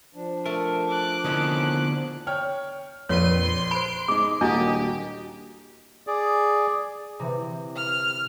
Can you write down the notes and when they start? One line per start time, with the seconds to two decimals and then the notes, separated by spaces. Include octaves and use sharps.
0.15 F3 D4
0.45 A3 A#4 E5 A5
0.88 D6 F#6
1.24 D3 D#3 B3 C#4 E4 A4
2.27 C#5 G5 F6
3.09 A#1 F2 B4 C#5 C6 D#7
3.71 C5 B5 D7
4.08 G#3 D#4 D6
4.41 D#1 A#3 D4 E4 F#4 G4 D#5
6.07 G#4 D5
7.19 C3 E3
7.75 F6